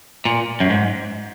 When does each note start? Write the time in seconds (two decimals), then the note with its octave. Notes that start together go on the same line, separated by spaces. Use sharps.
0.25 A#2
0.60 F#2
0.70 G#2